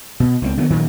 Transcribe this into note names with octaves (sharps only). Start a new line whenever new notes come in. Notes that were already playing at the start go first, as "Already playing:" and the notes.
B2
C#2 G#3 C4
D3 D#3 F#3 B3
A#2 D#3 F3 F#3